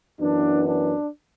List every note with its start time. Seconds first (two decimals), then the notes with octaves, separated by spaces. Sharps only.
0.21 F#2 E3 B3 D4
0.67 D4